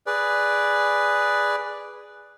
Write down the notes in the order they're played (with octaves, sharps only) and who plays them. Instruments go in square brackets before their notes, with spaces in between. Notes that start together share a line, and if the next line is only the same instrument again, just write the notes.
[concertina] G#4 B4 D5